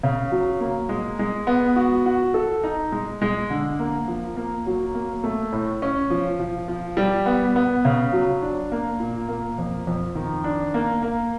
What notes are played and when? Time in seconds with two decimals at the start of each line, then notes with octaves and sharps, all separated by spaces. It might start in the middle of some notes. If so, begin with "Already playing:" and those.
0.03 C#3
0.32 F#3
0.60 A#3
0.89 G#3
1.19 G#3
1.47 B3
1.76 F#4
2.06 F#4
2.34 A4
2.64 D#4
2.92 G#3
3.22 G#3
3.50 D3
3.79 A#3
4.08 F3
4.37 A#3
4.67 F#3
4.94 A#3
5.24 A3
5.52 A2
5.82 C#4
6.10 F3
6.39 F3
6.68 F3
6.97 G3
7.26 B3
7.56 B3
7.85 C#3
8.13 F#3
8.42 D4
8.72 A#3
9.00 A#2
9.28 A#3
9.58 F2
9.87 F2
10.15 D#3
10.44 D4
10.74 A#3
11.03 A#3